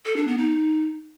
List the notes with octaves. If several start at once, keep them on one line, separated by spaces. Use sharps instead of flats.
A4
D4
B3
D#4